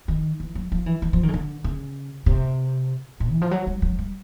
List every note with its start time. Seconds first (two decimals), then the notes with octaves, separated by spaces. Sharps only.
0.08 D#3
0.40 E3
0.55 F#3
0.72 F3
0.86 E3
1.02 E3
1.13 F3
1.23 D#3
1.28 C#3
1.34 D3
1.64 C#3
2.26 C3
3.20 A#2
3.31 E3
3.41 F3
3.51 F#3
3.67 G3
3.82 F#3
3.99 G3